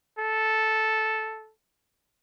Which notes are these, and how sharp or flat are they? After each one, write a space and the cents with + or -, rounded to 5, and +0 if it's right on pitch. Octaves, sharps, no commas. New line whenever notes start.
A4 -5